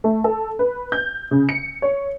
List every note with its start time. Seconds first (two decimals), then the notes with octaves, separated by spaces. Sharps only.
0.04 A3
0.24 A4
0.59 B4
0.92 G6
1.31 C#3
1.49 C#7
1.82 C#5